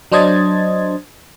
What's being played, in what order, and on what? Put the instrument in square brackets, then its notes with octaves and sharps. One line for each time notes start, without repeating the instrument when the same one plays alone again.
[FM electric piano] F#3 D4 C5 D#5 G#6 A6